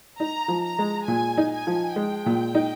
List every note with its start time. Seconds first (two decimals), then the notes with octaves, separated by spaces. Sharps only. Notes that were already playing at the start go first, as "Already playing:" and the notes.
0.19 D#4 A#5
0.48 F3
0.63 A#5
0.79 G#3
1.07 A#2 G#5
1.37 D#4
1.52 G#5
1.67 F3
1.96 G#3 G5
2.26 A#2
2.55 D#4